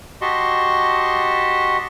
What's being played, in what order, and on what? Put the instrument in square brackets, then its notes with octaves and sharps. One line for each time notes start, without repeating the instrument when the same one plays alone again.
[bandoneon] F#4 G4 D#5 A5 C6 C#6